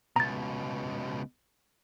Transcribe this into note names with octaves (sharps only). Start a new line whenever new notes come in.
C#2 B2 A#5 A6